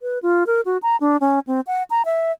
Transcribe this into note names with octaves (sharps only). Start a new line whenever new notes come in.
B4
F4
A#4
F#4
A#5
D4
C#4
C4
F#5
A#5
E5